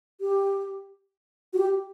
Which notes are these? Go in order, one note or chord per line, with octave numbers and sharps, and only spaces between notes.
G4
F#4
G4